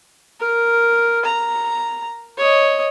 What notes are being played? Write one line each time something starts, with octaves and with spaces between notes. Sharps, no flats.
A#4
A#5
C#5 D#5